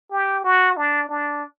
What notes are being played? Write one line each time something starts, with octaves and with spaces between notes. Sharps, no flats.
G4
F#4
D4
D4